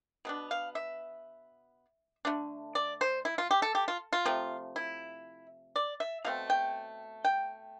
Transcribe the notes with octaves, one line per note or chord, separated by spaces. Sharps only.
B2 B3 D4
F5
E5
D3 A3 D4
D5
C5
E4
F4
G4
A4
G4
F4
F4
C3 F3 A3
E4
D5
E5
B2 A3 C4 F5
G5
G5